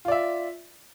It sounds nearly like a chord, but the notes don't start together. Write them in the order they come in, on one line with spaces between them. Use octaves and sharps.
F4 D5 E5